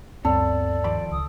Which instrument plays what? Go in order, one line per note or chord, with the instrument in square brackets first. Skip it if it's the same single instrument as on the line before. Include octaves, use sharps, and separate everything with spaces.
[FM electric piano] D2 G2 [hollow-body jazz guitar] B3 C4 C#5 [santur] A4 [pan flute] D5
[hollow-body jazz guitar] D#3 F3 B5 [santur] D6
[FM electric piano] C#2 [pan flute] D#6